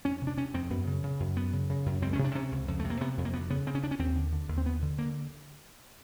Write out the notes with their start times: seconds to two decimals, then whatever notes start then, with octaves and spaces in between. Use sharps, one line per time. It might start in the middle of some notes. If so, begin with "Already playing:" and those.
0.05 F2 C#4
0.21 C3
0.27 D4
0.37 C3 C#4
0.54 F2 C4
0.70 F#2 B3
0.87 C#3
1.03 C#3
1.20 F#2
1.36 F#2 B3
1.53 C#3
1.70 C#3
1.86 F#2
2.02 C#2 C4
2.13 C#4
2.19 C3
2.24 D4
2.35 C3 C#4
2.52 C#2
2.68 F2
2.79 C3 A3
2.90 A#3
3.01 C3 B3
3.17 F2
3.25 A#3
3.33 D2 B3
3.50 C#3 B3
3.66 C#3 C4
3.75 C#4
3.83 D2 D4
3.91 C#4
3.99 D#2 C4
4.16 D3
4.33 D3
4.48 D#2
4.58 C4
4.65 D2 B3
4.82 D3
4.98 D3 A#3